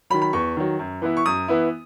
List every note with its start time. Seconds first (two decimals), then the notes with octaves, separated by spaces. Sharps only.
0.10 F#3 B5
0.14 D#3
0.22 B5
0.33 E2 C#6
0.57 D#3 F#3
0.79 F#2
1.02 E3 B3 E4
1.17 C#6
1.25 F#2 D#6
1.48 E3 B3 E4